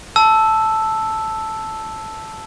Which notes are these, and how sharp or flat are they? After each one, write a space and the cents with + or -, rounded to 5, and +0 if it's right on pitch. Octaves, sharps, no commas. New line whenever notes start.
A5 +0 E6 +0